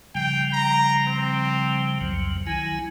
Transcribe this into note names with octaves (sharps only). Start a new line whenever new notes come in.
C#3 F3 G3 G5
A#5
C4
C2 F2 F#3
D#3 F#3 E4 G#5